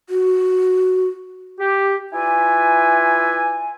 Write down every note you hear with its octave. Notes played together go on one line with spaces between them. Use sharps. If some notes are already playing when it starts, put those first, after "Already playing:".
F#4
G4
E4 F4 B4 D5 E5 G#5